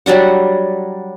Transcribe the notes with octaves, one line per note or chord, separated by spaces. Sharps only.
F#3 G3 D4 F#5